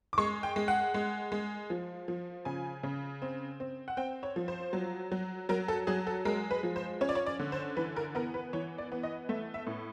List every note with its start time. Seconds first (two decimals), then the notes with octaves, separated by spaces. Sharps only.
0.13 D6
0.18 G#3 C#6
0.43 G5
0.56 G#3
0.68 F#5
0.94 G#3
1.32 G#3
1.70 F3
2.08 F3
2.45 C#3 G#5
2.83 C#3
3.22 C4
3.60 C4
3.88 F#5
3.97 C4 G5
4.23 C#5
4.36 F3
4.48 C5
4.73 F#3
5.12 F#3
5.49 F#3 A#4
5.68 A4
5.87 F#3 G#4
6.07 A4
6.25 G#3 A#4
6.51 B4
6.63 F3
6.76 C5
7.01 C#4 C#5
7.09 D5
7.15 C#5
7.26 D5
7.39 D3
7.52 C5
7.77 E3 B4
7.96 A#4
8.15 B3 A#4
8.34 B4
8.53 E3 C#5
8.78 D5
8.92 B3
9.03 D#5
9.29 A3 E5
9.54 E5
9.67 A2